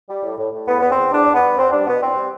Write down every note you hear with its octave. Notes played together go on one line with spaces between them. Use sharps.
G3
A2
A2
A2
E2 B3
E2 B3
C4
E2
E2 D4
E2
B3
G3
E2 C4
G3 D4
B2 B3
E2 C4
G3